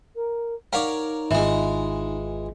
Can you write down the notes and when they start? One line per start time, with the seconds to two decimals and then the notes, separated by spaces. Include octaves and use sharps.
0.15 A#4
0.73 D#4 A#4 C#5 D5 F5 F#5
1.31 G#1 E3 G#3 F4 E5